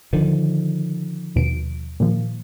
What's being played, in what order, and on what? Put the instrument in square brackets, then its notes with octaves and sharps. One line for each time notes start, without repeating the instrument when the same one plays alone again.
[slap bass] D3 D#3 F3
[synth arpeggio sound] D#2 B2 D7
A#2 D#3 F3